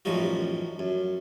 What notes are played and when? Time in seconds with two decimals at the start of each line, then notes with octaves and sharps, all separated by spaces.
0.05 A1 F#2 F3 G3 D#4 F#4
0.79 F#2